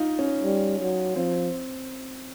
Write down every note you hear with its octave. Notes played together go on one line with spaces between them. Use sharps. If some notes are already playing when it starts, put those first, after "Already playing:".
Already playing: D#4 F4
C#4
G3
F#3
F3 C4